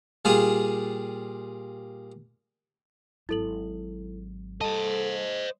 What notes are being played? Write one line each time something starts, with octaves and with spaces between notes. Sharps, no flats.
A#2 G3 F4 G#4 D#6
G#1 F#3 E4 A4 F#7
G3 A4 C5 D#5 A5